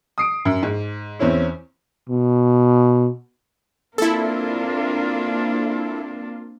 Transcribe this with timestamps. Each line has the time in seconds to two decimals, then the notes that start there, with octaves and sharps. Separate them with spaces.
0.18 D#6 C7 D7
0.45 F#2
0.63 G#2
1.19 E2 C4 C#4 E4
2.09 B2
3.98 A#3 C4 D4 E4 F4 A4 A#4